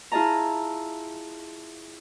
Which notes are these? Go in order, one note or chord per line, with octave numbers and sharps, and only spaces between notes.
E4 F4 G#4 D#5 A5 A#5